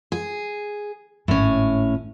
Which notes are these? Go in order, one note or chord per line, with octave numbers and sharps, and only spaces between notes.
G#4
G#1 A2 A3 C#4